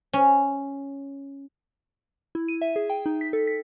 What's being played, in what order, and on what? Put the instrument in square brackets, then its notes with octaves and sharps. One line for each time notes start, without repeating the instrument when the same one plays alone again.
[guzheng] C#4
[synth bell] E4
D#7
E5
G#4
G5
D#4
B6
A4
B6